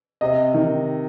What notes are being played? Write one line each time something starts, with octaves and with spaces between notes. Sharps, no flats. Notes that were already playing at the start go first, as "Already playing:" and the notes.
C3 D#5
D#3